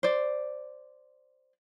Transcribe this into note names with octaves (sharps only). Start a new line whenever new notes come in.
C5 D5